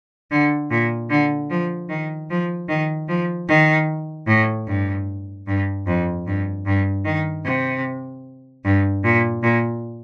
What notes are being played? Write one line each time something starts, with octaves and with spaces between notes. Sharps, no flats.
D3
A#2
D3
F3
D#3
F3
D#3
F3
D#3
A2
G2
G2
F2
G2
G2
D#3
C3
G2
A#2
A#2